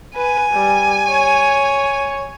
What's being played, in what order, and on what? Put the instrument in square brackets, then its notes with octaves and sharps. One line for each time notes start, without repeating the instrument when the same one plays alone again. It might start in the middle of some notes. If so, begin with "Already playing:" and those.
[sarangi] B4 [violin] G#5
[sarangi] G3
C#5